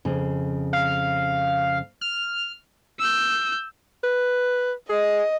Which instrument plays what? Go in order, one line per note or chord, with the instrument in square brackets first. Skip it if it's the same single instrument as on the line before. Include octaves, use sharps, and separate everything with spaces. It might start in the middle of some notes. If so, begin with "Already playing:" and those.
[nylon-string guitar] F2 C#3
[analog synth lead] F5
F6
[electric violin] E6 G6
[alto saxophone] B4
[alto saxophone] G#4 [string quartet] D#5